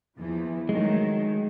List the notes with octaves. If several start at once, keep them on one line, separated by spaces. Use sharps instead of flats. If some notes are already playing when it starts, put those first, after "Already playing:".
E2 E3 F3
D#3 F#3 G#3 A3